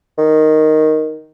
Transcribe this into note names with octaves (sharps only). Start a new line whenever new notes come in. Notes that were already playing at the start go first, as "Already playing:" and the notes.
D#3